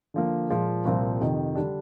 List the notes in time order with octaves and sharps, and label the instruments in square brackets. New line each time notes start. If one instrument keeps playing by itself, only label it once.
[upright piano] D3 F3 A#3
A#2 F3 G#3
C2 A#2 F3 C4
F2 C3 D#3
D3 G3 D4